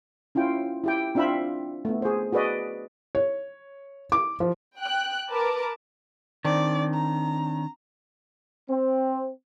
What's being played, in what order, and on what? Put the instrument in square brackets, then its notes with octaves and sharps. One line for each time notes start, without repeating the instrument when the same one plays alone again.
[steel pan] C#4 E4 F4 G5
E4 G4 G5
C4 D4 F4 E5 G5 B5
A3 B3
G#4 C5
F#4 G#4 B4 D5 D#5
[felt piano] C#5
D6
F3
[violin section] G5 F#6
A#4 B4 A5 D6
[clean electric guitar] D#3 [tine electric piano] C4 D4 [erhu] D5
[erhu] A#5
[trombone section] C4